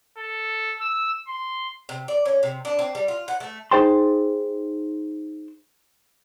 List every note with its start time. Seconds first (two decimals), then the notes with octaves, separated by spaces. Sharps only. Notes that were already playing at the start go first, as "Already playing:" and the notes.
0.18 A4
0.80 E6
1.27 C6
1.89 C3
2.08 D5
2.25 C#4
2.43 C3
2.65 D4
2.79 C4
2.95 G3
3.08 F4
3.28 F#5
3.40 A3
3.71 D#4 G#4 C5 G5 A5 C6